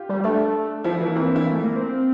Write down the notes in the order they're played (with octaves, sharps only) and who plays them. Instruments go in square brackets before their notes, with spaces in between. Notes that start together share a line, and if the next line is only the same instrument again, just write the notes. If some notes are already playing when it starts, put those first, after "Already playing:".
Already playing: [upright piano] F4 G4
[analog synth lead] G3
[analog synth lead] A3 [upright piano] D4
[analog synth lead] F3 [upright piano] E4
[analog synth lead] E3
[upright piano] A#3
[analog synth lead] E3 [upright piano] C4
[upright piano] D4
E4
F4
[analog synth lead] A3
A#3
C4